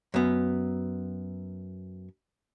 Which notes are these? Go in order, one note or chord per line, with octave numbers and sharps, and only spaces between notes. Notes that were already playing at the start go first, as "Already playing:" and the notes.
F#2 B3